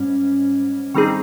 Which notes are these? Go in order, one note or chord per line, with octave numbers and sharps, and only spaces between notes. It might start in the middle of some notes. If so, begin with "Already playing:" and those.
Already playing: G#2 G3 C#4
D#3 G3 C4 D#4 G#4